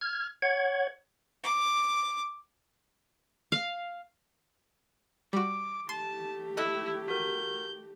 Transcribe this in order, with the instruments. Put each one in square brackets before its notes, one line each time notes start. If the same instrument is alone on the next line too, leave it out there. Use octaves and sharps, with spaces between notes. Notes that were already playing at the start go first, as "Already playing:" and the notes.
[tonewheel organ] F6 G#6
C#5 F#5 G#6
[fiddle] D6
[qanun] F5
[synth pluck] G3 F#4 [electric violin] D6
[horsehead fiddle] A3 G4 [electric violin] A5 [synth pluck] C6
[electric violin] E4 [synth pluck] A4 D#5 F#6
[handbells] F#4 A#4 [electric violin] G6